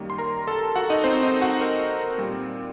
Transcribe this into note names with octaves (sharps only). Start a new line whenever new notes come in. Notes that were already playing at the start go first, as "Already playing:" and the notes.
Already playing: F#2 D#3 G3 A#3
C6
A#4 A#5
A4 A5
F#4 F#5
D#4 D#5
C4 C5
D#4 D#5
F#4 F#5
A#4
A#2 G3 C4